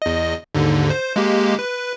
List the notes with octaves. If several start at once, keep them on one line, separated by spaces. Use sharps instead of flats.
E2 D#5
D#2 G#2 D3
C5
G#3 A#3 G4
B4